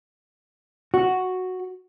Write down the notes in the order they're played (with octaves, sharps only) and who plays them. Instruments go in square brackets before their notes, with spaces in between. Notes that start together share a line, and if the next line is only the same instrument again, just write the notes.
[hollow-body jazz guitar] F#4